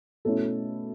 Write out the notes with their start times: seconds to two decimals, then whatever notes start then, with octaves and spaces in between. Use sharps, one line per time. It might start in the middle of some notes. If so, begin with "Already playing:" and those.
0.25 B2 A3 C#4 E4 A4